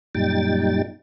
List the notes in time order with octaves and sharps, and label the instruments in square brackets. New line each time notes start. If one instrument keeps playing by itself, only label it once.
[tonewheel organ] F#2 A#2 G3 D#4 G5 A6